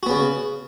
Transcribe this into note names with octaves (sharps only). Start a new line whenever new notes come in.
C#3 B3 F#4